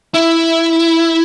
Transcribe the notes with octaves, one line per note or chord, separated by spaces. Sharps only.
E4